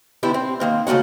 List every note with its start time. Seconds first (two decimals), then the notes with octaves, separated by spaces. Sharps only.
0.23 D3 B3 D4 E4 G4
0.34 C4
0.60 D#3 A#3 C4
0.87 C#3 A3 A#3 F#4 F#5